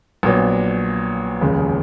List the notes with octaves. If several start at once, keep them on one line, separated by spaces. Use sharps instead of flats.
A#1 A#2 F#3 B3
F1 D#2 C#3 G#3